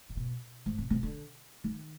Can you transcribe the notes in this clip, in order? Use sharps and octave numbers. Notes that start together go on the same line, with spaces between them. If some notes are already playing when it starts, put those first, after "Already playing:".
G#2
B2
G#2
C3
C3
D3
D#3